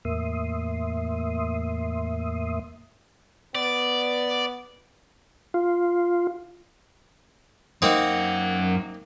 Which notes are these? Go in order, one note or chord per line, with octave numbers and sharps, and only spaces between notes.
E2 A2 A#3 E5 C6 D#6
B3 D5
F4
F#2 A#3 C4 D#4 F#5